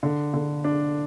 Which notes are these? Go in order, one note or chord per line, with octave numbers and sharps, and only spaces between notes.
D3
D3
D4